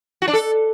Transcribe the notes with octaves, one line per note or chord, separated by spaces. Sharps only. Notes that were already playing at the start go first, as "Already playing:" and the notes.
F#4
D4
A4